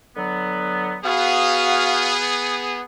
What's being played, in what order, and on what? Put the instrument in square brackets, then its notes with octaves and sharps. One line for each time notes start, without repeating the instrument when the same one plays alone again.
[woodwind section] D3 F#3 B3
[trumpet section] B3 G#4 [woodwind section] F#4 F5